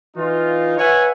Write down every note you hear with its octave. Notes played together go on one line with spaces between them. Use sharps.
E3 D#4 F4
B4 C#5 E5 F#5 G#5